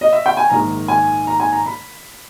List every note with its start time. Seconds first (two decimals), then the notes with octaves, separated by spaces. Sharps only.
0.01 D#5
0.13 E5
0.26 G5
0.37 G#5
0.50 A#1 G#2 D#3 A#5
0.88 G#5
1.27 A#5
1.40 G#5
1.52 A#5
1.66 B5